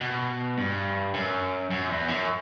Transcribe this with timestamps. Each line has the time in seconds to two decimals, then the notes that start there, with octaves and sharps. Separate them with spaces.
0.01 B2
0.57 G2
1.14 F#2
1.71 F#2
1.89 E2
2.08 F#2